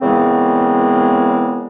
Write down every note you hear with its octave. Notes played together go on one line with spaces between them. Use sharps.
A#2 C#3 E3 G#3 B3 C4